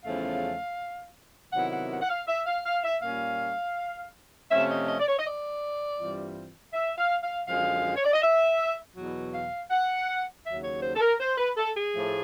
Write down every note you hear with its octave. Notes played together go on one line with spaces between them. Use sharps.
E2 C#3 F3 A3 C#4 F5
C3 D#3 F#3 B3 E4 F#5
F#5
F#5
F#5
F5
E5
F5
F5
E5
A#2 G3 A#3 C#4 F5
C3 F3 A3 C#4 E5
D#5
D#5
D5
C#5
D#5
D5
G2 E3 G3 C4 F4
E5
F5
F5
F#2 D3 F3 G#3 F5
C#5
D5
D#5
E5
E2 B2 F#3
F5
F#5
D#2 C#3 F#3 E5
C#5
C5
A4
A#4
C5
B4
A4
G#4
A2 F3 A3